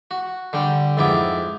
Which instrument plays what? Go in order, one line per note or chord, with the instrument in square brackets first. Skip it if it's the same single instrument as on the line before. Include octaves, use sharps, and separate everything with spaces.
[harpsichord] F#4
D3 G3 G5
F2 G#2 B3 E4 D6